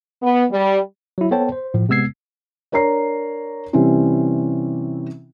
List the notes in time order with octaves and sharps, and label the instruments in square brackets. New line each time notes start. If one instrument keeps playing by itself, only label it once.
[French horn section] B3
G3
[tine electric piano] F#3 E4
B3 A4 C5 C#5 G5 A5
C5
A2 F3
C3 G#3 B3 E6 G#6 C7
[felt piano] D4 A#4 C#5 A#5 C7
C3 E3 G3 C4 C#4 E4